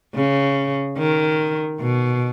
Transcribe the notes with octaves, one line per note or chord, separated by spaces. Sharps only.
C#3
D#3
B2